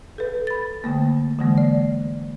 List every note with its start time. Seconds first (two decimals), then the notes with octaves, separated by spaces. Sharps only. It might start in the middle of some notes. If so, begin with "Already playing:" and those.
0.18 A4 B4
0.47 B5 A6
0.84 D3 A3 A#3
1.39 D3 E3 G#3 A#3
1.58 D5